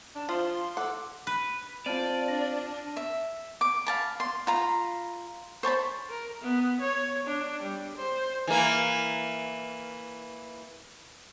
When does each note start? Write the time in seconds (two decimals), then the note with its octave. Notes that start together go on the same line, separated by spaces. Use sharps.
0.15 D4 A5
0.29 F3 F4 C6
0.77 A4 F#5 D6
1.27 B4
1.86 C4 F4 D5 A5 F6 D#7
2.28 D4 A#6
2.97 E5
3.61 D6
3.87 F5 A5 B5
4.20 C6
4.47 F4 A#5 B5
5.63 C5 C#5 A5 B5
6.10 A#4
6.42 B3
6.81 C#5
7.27 D4
7.63 G3
7.96 C5
8.47 E3 A#3